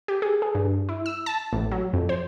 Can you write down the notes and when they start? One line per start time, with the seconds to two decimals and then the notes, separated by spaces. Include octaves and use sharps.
0.08 G4
0.22 G#4
0.42 G#4
0.55 G2
0.89 E4
1.06 E6
1.26 A5
1.53 A1
1.71 F#3
1.93 F2
2.09 C5